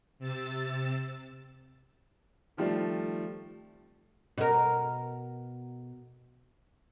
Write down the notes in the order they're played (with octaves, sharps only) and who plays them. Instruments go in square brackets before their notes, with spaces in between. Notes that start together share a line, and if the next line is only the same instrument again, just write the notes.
[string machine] C3 E6 A6
[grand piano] D#3 F3 G3 A3 C4
[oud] B2 A#4